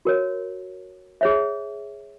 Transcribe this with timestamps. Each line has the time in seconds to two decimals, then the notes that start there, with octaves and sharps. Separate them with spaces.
0.05 F#4 A#4 C#5
1.21 G#4 C#5 E5